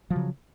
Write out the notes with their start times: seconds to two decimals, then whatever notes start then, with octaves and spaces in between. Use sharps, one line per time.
0.10 F3
0.13 F#3
0.16 C#3